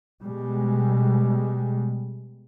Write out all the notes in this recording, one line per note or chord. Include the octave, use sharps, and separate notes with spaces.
B2 G3 G#3